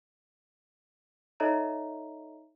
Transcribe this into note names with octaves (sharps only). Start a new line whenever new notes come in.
D#4 A4 C#5 D#5 E5 A#5